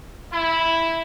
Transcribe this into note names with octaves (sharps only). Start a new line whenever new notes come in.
E4